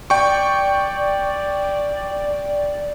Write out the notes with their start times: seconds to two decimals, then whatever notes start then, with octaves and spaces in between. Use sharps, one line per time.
0.10 D5 G5 C#6